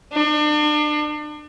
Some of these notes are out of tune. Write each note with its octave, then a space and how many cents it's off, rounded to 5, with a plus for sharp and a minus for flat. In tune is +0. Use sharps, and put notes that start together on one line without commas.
D4 +35